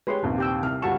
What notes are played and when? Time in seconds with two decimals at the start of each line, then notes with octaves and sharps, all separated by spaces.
0.07 G#3 G4 B4 C#5 C6
0.22 A#1 D#2 C3
0.38 G4 G5 E6
0.63 C2 F6
0.82 C#2 G3 F#4 A5 C#6 E7